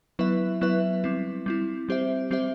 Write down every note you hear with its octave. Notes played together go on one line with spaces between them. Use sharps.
F#3 B3 E4 B4 E5
F#3 B3 E4 B4 E5
G3 C4 E4
G3 C4 E4
G3 C4 G4 C5 E5
G3 C4 G4 C5 E5